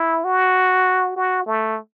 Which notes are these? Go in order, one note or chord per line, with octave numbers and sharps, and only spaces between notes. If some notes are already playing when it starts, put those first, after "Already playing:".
Already playing: E4
F#4
F#4
A3